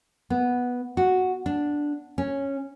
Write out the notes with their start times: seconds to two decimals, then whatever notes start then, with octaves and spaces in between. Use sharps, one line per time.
0.30 B3
0.97 F#4
1.46 D4
2.18 C#4